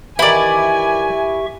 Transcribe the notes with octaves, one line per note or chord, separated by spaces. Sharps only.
D#3 E3 E4 G4 D5 E5 G#5 C#6